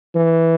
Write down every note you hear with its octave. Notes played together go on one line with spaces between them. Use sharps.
E3